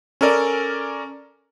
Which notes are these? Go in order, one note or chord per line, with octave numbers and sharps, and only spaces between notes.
C#4 A4 A#4 D5